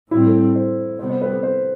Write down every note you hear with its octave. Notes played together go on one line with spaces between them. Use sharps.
A2 G3 C4 E4
A4
C5
C3 G3 B3 C5
C5
B4
A4
C5